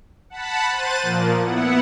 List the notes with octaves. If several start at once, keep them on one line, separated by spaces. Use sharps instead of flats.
F#5 A5 B5
C5 F#6 A6 D#7
A#2 F3 A#3
B3 E4 F#5